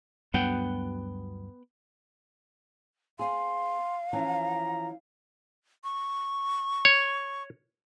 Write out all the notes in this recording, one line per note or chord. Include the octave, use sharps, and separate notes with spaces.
D2 G2 F#3 B3 F#5 G5
C4 G#4 F5 C6
E3 F3 C#4 A#5
C#6
C#5